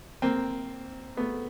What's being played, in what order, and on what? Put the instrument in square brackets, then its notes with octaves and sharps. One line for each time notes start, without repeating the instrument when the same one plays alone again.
[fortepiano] A#3 C4
A3 B3